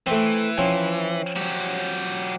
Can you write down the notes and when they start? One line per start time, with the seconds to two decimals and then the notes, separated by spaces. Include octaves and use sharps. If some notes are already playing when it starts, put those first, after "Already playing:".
0.07 E3 A3 C4
0.58 F3 C4 C#4
1.36 F#3 G4